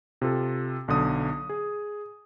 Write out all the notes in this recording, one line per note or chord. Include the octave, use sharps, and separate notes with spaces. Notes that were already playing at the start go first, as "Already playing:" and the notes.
C3 F4 A4
B1 D3 D#6
G#4